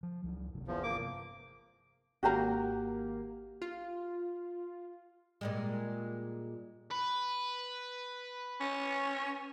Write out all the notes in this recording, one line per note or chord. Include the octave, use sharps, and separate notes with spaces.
F3
C#2 F#3
G1 C3
E2 F3
A#3 D6
G#1 A#3 F#4 G4 A#5
F4
A#2 G3 G#3
B4
C#4